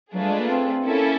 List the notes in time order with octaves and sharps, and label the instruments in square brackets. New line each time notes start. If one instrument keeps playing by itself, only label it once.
[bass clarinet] F#3 [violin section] A3 D4 F4 G#4 B4
[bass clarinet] G3
G#3
A#3
C4
[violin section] A#3 C#4 E4 A4